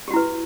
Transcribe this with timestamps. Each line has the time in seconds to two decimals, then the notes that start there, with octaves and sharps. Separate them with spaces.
0.08 G4
0.11 F#4
0.13 E4
0.16 B4